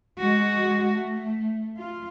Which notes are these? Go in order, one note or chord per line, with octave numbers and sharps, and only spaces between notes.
G#3 F#4
A3
F4